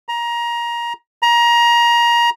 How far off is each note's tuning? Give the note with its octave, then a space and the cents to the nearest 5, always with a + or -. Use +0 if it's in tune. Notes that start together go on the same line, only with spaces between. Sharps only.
A#5 +20
A#5 +25